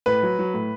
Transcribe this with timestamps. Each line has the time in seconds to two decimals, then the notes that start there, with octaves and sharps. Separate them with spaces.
0.06 A2 B4
0.23 F#3
0.39 F#3
0.54 A2